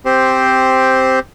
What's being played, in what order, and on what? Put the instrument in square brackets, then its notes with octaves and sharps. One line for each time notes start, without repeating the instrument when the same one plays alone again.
[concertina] C4 G4 C5